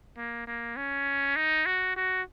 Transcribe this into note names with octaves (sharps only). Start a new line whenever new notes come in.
A#3
A#3
C#4
D#4
F#4
F#4